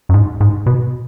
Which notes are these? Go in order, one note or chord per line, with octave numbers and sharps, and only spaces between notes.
F#2
G#2
G#2
B2